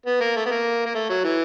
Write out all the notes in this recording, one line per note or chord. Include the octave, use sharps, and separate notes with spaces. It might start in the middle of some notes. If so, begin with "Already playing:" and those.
B3
A#3
A3
B3
A#3
A#3
A3
F#3
E3